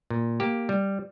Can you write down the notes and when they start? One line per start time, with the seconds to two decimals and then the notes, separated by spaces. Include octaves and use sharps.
0.10 A#2
0.40 A#3 G4
0.69 G3